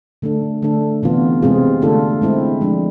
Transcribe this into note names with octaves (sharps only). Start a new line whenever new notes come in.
D3 A3 D4 A4
D3 A3 D4 A4
C3 E3 B3 F4
C3 G#3 C4 F4 G#4
D3 A3 D4 F4 A4
G#3 C4 E4
F3 G#3 D4